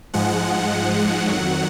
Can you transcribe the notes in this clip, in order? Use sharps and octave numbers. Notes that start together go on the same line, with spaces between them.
G#2 F3 G#3 F#5
F#5
F2 D#3 F#3